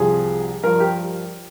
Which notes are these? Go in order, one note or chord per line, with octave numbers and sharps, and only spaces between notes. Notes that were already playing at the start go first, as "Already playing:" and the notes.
Already playing: C2 C3 F3 G#4
G2 F3 A#4
G4